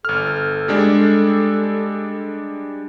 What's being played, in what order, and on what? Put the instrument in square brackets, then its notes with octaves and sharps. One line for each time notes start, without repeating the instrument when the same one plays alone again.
[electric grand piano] G1 F6 [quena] A4
[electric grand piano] G3 G#3 D4